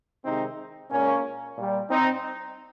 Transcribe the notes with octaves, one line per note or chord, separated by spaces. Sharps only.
C3 D#3 G#3 C4 D#4
A#2 G#3 A#3 C#4
A#2 G3
C4 D#4